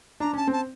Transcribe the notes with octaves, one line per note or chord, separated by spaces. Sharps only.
D4 A#5
C#4 A5
C4
A5